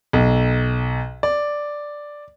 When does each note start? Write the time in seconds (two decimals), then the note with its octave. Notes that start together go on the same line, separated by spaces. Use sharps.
0.13 B1
1.23 D5